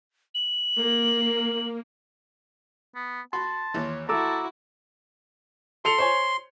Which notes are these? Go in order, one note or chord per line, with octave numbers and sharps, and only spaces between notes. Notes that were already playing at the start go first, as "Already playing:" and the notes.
F#7
A#3
B3
F#4 A5 B5 C6
D#2 E3 C#5
A3 E4 F#4 A5 A#5 D6 E6
A4 C6 C#7 F7
C5 C#5 G#5